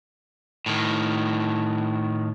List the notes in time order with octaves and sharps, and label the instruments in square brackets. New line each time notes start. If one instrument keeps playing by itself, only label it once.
[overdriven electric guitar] A2 D#3